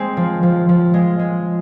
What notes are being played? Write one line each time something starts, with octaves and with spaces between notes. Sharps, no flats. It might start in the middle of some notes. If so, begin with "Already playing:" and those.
Already playing: G#3 C4
F3
F3
F3
G#3
G#3